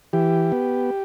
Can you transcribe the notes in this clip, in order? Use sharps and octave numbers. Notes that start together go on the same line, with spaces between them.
E3 G4
B3